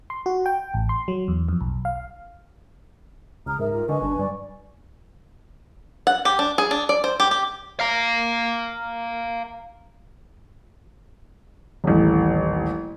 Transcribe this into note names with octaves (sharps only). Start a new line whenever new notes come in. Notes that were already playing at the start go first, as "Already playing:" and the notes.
C6
F#4
G5
A1
C6
F#3
E2
F2
B1
F5
C#2 A#5 D#6 F6
G#2 A#4 E5
F4 G4
D3 B4 D#5 G#5 C#6
G1 D4
G2 D5
F#5
G4
D4
G#4
D4
D5
C5
G4
G4
F5 A#5
D#1 A1